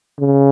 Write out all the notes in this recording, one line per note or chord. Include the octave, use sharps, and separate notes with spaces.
C#3